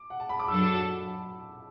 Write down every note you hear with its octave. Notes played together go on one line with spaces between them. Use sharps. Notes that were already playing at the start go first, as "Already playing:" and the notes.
Already playing: D6
F#5
A5
B5
D6
F#2 F#3 D4 A4 B5 E6